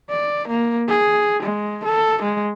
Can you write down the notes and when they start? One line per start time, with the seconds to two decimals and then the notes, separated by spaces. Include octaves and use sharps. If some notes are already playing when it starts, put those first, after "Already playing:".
0.10 D5
0.48 A#3
0.88 G#4
1.43 G#3
1.84 A4
2.22 G#3